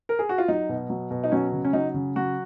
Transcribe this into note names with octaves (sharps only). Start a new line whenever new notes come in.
A#4
G#4
F#4
F4
F#3 D#4
B2
F#3
B2
D#4
F#3 C#4
C#3
C#4
F#3 D#4
C#3
F#3 F#4